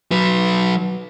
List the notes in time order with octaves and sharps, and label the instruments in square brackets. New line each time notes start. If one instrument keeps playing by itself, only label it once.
[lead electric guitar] F#3 B4